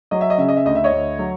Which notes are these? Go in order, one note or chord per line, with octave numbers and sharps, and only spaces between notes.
F#3 D#5
E5
D#5
C#3 E5
D#5
E5
D2 D#5
E5
C#5 D#5
D2
F#3